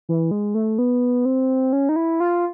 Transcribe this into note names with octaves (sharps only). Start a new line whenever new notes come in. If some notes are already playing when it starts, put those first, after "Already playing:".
E3
G#3
A3
B3
C4
C#4
D#4
E4
F4